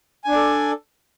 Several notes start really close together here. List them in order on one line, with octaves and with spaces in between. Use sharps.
G#5 D4 D5 A4